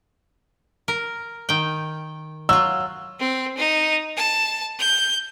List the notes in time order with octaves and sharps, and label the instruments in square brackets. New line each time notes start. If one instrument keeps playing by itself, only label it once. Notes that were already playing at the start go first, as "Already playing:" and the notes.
[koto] A#4
D#3 G5
[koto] F#3 F4 [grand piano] E6
[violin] C4
D#4
A5
G6